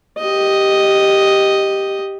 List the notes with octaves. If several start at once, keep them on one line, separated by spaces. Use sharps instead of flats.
G4 D#5